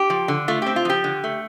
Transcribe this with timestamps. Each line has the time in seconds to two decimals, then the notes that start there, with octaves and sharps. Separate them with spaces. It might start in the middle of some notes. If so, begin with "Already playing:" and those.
Already playing: G4
0.10 F3
0.28 D3
0.48 A3 F4
0.62 C4 G4
0.76 F4
0.85 F3 G4
1.04 D3
1.24 A3